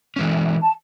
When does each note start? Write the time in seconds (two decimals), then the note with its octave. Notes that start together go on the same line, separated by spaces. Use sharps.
0.16 E3 G#3 C#4
0.61 A5